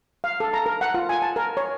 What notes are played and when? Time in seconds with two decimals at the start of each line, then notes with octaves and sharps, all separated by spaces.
0.24 F5
0.40 A4
0.54 A#5
0.66 A#4
0.81 F#5
0.94 F4
1.09 G#5
1.22 A5
1.36 A#4
1.57 C#5